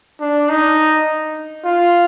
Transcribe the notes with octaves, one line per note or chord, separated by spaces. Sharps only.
D4
D#4
F4